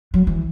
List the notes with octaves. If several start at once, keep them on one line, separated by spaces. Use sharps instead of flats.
F#3
E3